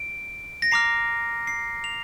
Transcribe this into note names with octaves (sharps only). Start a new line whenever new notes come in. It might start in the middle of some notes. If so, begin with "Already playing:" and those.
Already playing: D7
A#6
A#5 D6 F6 C7
C7
F7